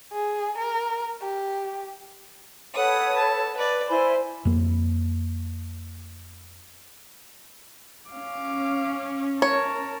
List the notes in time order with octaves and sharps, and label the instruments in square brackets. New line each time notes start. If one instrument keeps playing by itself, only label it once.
[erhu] G#4
A#4
G4
[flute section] A4 B4 C#5 [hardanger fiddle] F#5 D#6
[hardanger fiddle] A5
B4 D5
[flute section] E4 G#5 B5 [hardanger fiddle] C5
[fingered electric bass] F2 A#3
[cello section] C#4 [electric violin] F5 D6
[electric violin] A#4 A5 [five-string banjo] C#5